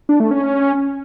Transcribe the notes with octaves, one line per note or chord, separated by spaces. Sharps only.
D4
A3
C#4